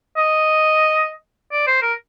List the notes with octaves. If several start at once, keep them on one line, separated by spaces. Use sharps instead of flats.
D#5
D5
C5
A#4